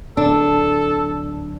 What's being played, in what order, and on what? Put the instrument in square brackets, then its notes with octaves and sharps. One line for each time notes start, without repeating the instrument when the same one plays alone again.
[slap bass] D1 [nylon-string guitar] D4 [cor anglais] A4